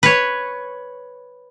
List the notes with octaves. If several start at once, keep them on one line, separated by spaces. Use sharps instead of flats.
B4 C#5